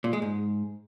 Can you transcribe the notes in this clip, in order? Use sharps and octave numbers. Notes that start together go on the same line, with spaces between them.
A#2
G#3
G#2